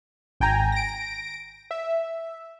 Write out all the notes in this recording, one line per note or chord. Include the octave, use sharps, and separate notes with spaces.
G#1 G5 G#5 A#5
A#6 D7
E5